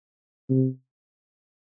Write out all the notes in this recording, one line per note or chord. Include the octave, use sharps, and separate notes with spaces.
C3